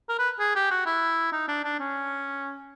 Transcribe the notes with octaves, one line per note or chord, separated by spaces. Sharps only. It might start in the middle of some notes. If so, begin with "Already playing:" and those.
A#4
B4
G#4
G4
F#4
E4
D#4
D4
D4
C#4